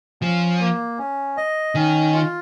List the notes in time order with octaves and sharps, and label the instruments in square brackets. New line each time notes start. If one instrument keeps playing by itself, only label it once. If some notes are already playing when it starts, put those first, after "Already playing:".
[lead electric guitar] F3 [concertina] C#4
[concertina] A#3
C#4
D#5
[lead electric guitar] D#3 [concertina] C#4
[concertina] F4